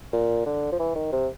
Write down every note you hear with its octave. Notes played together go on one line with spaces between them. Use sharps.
A#2
D3
F3
E3
D#3
C3